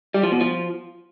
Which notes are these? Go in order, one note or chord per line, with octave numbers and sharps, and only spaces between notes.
G3
F3
B2
F3